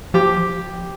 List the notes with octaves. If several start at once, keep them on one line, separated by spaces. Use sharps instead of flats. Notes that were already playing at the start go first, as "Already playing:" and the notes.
F3 G4